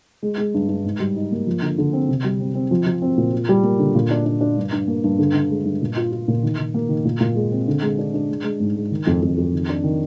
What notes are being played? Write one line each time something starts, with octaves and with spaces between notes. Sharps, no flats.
G#3
G#3
G2
G2
G#2
G3
D#4
A#3
F3
D3
D3
C4
C3
G3
C4
C4
F3
F3
C4
A#2
F4
G3
A#3
D3
A#2
D4
D4
D4
G2
G2
A#3
G2
D3
D3
G#3
G2
A#2
F4
F4
A#2
D#3
D#3
A#3
D#3
A#2
A#2
G#3
C4
D3
G#3
D4
D4
G#3
G#3
G#2
G#3
D#3
F2
F2
F2
D#3
D4
D#3